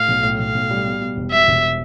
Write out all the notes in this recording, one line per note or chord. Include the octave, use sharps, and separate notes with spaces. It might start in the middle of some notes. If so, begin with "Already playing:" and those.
Already playing: A2 F5
B1
A2
B1 F5
B1
G3
B2
B2
E1
B2 E5
E1